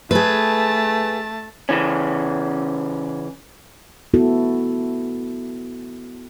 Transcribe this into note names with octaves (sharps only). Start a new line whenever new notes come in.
A3 G#4 B4 A5
C#3 E3 C#4
B3 E4 F#4 A4